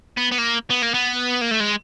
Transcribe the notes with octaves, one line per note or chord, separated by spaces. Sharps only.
B3
B3
A#3
B3
A#3
B3
A#3
A3
G#3